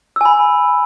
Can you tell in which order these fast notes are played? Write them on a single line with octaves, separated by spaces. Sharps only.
E6 G#5 B5